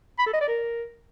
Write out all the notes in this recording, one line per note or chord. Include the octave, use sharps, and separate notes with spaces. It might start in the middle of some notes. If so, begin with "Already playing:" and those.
B5
A4
D#5
D5
A#4